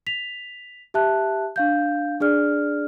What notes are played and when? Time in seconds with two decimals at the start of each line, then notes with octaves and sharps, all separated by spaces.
0.07 B6 F7
0.94 G4 E5 A5 F#6
1.56 D4 F5 G6
2.20 D4 G#4 D5 F6